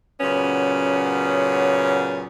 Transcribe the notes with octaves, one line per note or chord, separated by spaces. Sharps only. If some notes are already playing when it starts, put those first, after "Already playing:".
A#2 C#3 F#3 B3 C#4